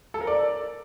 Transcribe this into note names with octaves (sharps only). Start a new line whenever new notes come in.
A4
A#4
D5